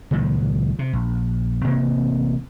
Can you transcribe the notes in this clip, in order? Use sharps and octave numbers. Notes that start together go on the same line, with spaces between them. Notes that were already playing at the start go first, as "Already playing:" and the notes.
C#2 A#2 D#3 F#3
C3
A#1
A1 C3 A#3 C4